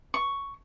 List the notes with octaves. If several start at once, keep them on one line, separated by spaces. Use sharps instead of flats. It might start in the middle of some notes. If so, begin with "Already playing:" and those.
C#6